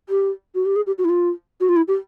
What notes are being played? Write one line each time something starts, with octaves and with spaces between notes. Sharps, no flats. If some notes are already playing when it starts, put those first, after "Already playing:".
G4
F#4
G4
G#4
G4
F#4
E4
F4
F#4
F4
E4
G4